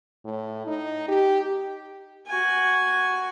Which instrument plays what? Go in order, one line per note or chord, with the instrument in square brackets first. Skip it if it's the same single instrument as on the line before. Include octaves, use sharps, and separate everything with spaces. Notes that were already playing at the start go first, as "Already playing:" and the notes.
[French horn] A2
D#4
G4
[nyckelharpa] F#4 G#5